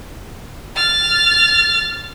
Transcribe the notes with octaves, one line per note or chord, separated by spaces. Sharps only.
F6 A6